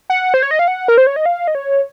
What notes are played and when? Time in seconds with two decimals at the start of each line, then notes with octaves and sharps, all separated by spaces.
0.10 F#5
0.34 C5
0.43 C#5
0.51 D#5
0.59 F5
0.68 F#5
0.88 A#4
0.98 C5
1.07 C#5
1.16 D#5
1.26 F5
1.47 D#5
1.55 C#5